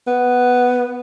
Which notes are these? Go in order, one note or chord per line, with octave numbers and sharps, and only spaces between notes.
B3